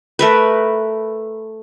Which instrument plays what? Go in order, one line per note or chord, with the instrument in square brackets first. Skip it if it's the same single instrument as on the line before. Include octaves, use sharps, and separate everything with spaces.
[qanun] A3 A#4 B4